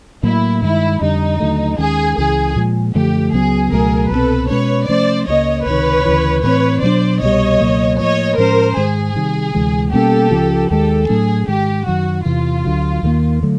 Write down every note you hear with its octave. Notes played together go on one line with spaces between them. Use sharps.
A2 F#3 A#3 E4
G2 D#3 G#3 E4
F2 D3 G3 D#4
D#2 D3 F#3 A3
D#2 D#3 G#3 C#4 G#4
C#2 C#3 E3 G#4
A#2 F3 G#3
F#2 D3 F3 A3 G4
C#2 C#3 F#3 B3 G#4
C#2 B2 F#3 A3 G#4 A#4
C2 B2 G3 C4 A4 B4
B2 G#3 C#4 B4 C#5
C3 F3 A3 C#4 C5 D5
C#2 C#3 F3 A#3 C#5 D#5
C#2 C3 D#3 B4 C#5
D2 C#3 E3
A2 E3 G#3 C4 B4 C#5
B2 F#3 A#3 D4 C5 D5
C2 B2 G3 C#5 D#5
C#2 B2 F#3 A#3
A2 F3 A#3 C#5 D#5
A2 F3 G#3 C#4 A#4 C5
G#2 D#3 G#3 G#4
C3 D#3 G3
D2 C3 E3 G#3
B2 G3 A#3 C#4 G4 A4
C#2 C#3 F3
D#2 D#3 G#3 G4 A4
A2 F#3 A3 D4 G#4
G#2 D#3 G#3 G4
F#2 D#3 F#3 F#4
E2 C3 E3 F4
D2 D3 F#3
D#2 D#3 G3 A#3
D3 F#3 A3